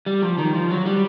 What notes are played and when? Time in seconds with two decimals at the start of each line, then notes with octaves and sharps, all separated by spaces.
0.06 G3
0.22 F3
0.38 D#3
0.54 F3
0.70 F#3
0.86 G3